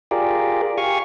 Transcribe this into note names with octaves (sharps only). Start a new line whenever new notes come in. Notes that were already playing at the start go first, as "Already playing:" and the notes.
F4 G4 G#4 A#4 D5
G4 F5 G#5 C#6